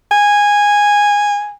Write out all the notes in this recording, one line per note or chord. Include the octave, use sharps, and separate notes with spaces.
G#5